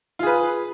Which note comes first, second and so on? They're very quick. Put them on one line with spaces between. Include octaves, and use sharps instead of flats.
F4 G#4 B4